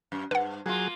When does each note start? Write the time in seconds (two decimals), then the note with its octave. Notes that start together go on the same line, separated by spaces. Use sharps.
0.12 F#2
0.31 G2 B4 F#5
0.66 F#3 A#3 F4 G#4